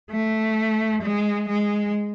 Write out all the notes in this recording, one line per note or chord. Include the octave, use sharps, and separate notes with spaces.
A3
G#3
G#3